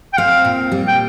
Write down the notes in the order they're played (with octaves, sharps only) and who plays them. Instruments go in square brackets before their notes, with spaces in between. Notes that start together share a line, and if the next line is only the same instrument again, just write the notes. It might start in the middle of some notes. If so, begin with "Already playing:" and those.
[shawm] G5
[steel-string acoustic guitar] C4 [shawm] F5
[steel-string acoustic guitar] A#2
G3
[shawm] G5